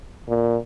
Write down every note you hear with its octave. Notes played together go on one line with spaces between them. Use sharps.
A#2